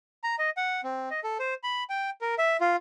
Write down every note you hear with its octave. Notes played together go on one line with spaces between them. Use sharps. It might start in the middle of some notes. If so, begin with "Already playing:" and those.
A#5
D#5
F#5
C4
D#5
A4
C5
B5
G5
A#4
E5
F4